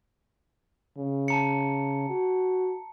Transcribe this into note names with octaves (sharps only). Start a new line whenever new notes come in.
C#3
A5 A#5 C#7
F#4